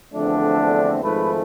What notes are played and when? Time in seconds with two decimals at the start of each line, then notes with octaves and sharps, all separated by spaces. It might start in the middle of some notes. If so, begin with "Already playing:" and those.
0.13 E2 D3 F3 A3 C4 D4
1.03 G#1 G#2 F3 A3 B4